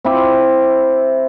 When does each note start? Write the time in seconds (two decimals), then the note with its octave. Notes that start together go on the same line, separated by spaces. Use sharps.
0.05 C4 E4 D6